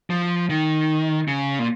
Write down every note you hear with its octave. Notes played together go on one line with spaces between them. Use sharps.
F3
D#3
C#3
A#2